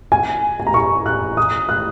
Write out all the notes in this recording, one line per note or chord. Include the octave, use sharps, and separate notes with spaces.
G#5
G#5
A#5
C#6
F#6
D#6
F#6